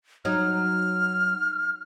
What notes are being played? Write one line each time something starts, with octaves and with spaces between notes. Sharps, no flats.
F#3 D#4 F6